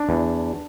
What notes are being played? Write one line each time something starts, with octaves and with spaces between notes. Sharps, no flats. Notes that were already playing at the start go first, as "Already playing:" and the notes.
Already playing: D4
E2